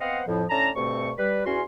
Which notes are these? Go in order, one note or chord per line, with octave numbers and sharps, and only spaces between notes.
B3 C4 C5 D#5 F5 F#5
F2 A2 F3
A2 D3 C#4 A5 A#5
D2 G2 B2 A3 C4 C#6
G3 B4
E2 C#4 F#4 C6